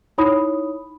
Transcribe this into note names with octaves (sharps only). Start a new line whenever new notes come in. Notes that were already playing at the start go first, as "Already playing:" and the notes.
D#4 E4 C#5 B5 D#6